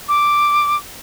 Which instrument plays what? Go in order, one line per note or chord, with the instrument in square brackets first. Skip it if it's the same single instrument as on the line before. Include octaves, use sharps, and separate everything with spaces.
[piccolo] D6